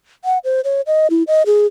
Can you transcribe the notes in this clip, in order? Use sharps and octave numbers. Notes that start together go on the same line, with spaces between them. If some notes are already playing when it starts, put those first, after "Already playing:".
F#5
C5
C#5
D#5
E4
D#5
G#4